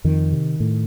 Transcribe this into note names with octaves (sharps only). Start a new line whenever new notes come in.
F2 D#3
C3
A2